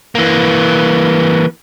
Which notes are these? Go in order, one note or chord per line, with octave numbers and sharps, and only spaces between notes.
E3 A#3